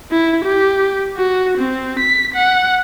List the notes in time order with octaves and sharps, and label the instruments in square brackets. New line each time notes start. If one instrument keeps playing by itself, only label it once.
[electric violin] E4
G4
F#4
C4
B6
F#5